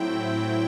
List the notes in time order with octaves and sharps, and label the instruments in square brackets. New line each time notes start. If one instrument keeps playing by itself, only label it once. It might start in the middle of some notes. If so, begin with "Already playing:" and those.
Already playing: [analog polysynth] A2 F#3 C4 E4 G5